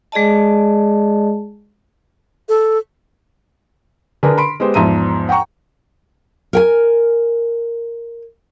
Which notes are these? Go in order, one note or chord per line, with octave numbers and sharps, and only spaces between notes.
G#3 G#4 D5 D#5 A5
A4
D3 D4 G#4 A#4 B4
B5 C6 D7
G#3 B3 G4 C5
E2 G#2 F3 E5 A#5 D#7
F#5 G5 A#5 C#6
A#4 G5 G#5